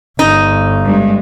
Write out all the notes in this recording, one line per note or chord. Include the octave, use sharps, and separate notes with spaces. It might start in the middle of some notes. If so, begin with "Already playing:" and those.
G1 D#4
G2 G#3